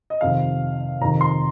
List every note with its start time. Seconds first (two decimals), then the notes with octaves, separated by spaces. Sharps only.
0.10 D#5
0.21 F2 C3 D#3 F5
1.01 F2 C3 D#3 A#5
1.21 C6